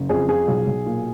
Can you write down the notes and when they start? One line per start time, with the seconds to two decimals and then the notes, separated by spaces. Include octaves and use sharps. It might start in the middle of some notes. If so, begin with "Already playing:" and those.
Already playing: F#1
0.09 F2 G#4
0.28 F3 G#4
0.48 B1
0.67 B1
0.86 A#2